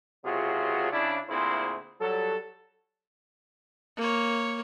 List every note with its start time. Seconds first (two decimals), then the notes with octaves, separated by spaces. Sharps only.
0.25 C#2 C3 F#3 F4 F#4 G#4
0.92 C#3 D4 E4
1.29 D2 A#2 C4 E4 G#4 C5
2.01 F#3 G3 A4
3.97 A#3 C#5